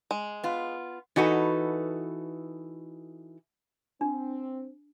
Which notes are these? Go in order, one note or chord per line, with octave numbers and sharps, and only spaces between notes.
G#3
B3 F4
E3 D#4 F#4 A4 B4
C4 D4